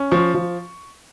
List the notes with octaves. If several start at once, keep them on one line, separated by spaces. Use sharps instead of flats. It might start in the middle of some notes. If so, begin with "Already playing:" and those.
Already playing: C#4
F3 C#6
F3